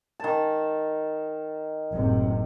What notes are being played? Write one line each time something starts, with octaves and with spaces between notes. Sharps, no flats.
D#3 A5
F#1 A2 C3